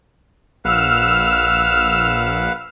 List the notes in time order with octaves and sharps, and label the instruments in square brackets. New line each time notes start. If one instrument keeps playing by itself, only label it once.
[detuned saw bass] A#1 [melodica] B4 F5 F#5 [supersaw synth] E6 F6